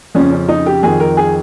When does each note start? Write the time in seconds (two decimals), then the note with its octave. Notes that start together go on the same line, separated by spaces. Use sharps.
0.15 F2 C#3 F3 C#4
0.32 C#4
0.49 D#4
0.66 G4
0.83 F2 D#3 G#4
1.00 A#4
1.17 G#4